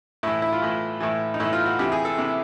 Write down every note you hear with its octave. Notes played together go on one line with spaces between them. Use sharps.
A2 E3 E4
E4
F4
A2 E3
A2 E3
D#4
A2 E3 E4
F4
F#4
C3 E3 G4
G#4
A4
C3 E3